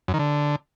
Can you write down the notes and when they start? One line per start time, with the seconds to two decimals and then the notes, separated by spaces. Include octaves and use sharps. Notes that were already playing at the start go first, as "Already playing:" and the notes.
0.08 F#2
0.14 D#3
0.19 D3